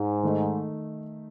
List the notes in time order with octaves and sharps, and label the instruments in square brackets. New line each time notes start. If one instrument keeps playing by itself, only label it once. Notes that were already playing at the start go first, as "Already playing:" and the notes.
Already playing: [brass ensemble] G#2
[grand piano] D#3 A3 D#4